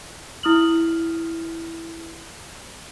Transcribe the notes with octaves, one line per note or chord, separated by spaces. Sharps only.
E4 D#6 F6 F#7